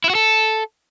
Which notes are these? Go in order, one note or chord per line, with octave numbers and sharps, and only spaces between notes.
E4
F#4
A4